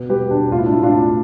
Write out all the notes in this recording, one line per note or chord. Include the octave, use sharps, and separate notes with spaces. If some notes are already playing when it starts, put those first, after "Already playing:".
Already playing: B2
G3 G4 B4
B2 D4
A2 F4
E4
D4
A2 E4
D4 F4
A2